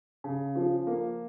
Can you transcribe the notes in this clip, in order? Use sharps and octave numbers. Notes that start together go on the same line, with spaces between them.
C#3
F3
A#3